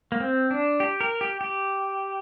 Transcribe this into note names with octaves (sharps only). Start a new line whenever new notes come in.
A#3
C4
D4
G4
A#4
G4
G4